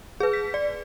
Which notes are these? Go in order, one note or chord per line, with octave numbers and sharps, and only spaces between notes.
G#4 B4
B6
D5